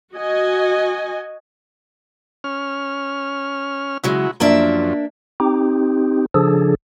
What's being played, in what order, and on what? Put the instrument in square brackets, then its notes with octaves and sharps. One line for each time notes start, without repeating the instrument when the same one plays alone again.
[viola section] F#4 D#5 G#5
[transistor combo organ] C#4 F6
[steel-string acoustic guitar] C#3 F#3 G#3 [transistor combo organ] E4 F#4
[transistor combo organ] F#2 F3 [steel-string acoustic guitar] A#3 D4 E5
[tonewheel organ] C4 D#4 G4
C#3 F3 D4 G#4 A4